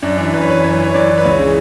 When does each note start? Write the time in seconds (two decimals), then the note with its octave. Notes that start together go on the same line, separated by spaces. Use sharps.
0.02 F#2 D4
0.17 E3 D4
0.33 F#2 B4
0.41 C#5
0.49 E3 B4
0.63 F#2 C#5
0.79 E3 C#5
0.94 F#2 D5
1.09 E3
1.18 B4
1.24 C#2 C#5
1.39 C#3 E3